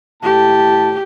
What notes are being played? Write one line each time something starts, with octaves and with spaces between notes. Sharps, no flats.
A2 G4 A5